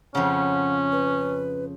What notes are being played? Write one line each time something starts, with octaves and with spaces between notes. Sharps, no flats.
F2 C#3 C#4 F#5
B4